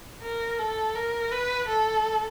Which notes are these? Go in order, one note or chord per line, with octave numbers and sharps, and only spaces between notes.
A#4
A4
A#4
B4
A4